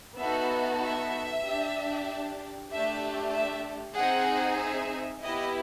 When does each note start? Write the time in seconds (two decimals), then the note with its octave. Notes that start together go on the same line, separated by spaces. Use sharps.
0.19 B3 D#4 F#4 A4 E5
0.82 E5
1.45 D4 G4
2.71 A3 D4 G4 E5
3.34 E5
3.96 C4 D#4 G#4 F#5
4.59 E5
5.22 B3 E4 G4 D#5